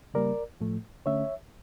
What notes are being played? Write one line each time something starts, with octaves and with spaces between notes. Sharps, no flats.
C#3 G3 A#3 A#4 D5
A2 F3 A3
D3 A3 C#4 C#5 E5